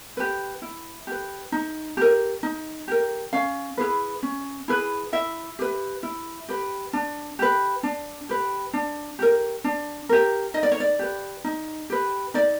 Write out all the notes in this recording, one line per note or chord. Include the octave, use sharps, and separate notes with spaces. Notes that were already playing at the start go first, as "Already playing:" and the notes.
G4 B4
E4
G4 B4
D#4
G4 A#4
D#4
G4 A#4
C#4 F5
E4 G#4 B4
C#4
E4 G#4 B4
E4 E5
G4 B4
E4
G4 B4
D4
G4 B4
D4
G4 B4
D4
G4 A#4
D4
G4 A#4
D#4 D#5
D5
C#5
D5
G4 B4
D#4
G4 B4
D#4 D5